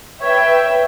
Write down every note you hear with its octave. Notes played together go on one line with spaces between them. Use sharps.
B4 C#5 E5 G5